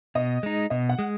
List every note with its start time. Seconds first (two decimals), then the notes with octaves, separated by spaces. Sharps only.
0.15 B2 D#5
0.43 G#3 D#4
0.70 B2 D#5
0.89 F#5
0.99 G#3